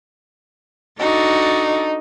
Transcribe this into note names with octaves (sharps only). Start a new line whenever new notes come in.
D4 D#4 F#4 A4